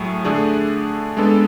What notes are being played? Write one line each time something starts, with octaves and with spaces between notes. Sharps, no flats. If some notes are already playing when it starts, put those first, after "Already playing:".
Already playing: A2 F#3 A3 G#4
D3 A3 D4 G#4
G#3 B3 D4 A4